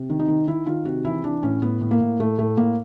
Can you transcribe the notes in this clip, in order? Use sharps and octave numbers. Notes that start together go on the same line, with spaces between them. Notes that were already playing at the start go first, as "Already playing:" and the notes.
Already playing: C3
D#3
D#4
D#3
D#3 E4
D#3 F4
C3 F#4
E3 E4
E3 D4
A2 C#4
A2 B3
A2
A#3
A2
A2 A3
A2 A3
A2 A#3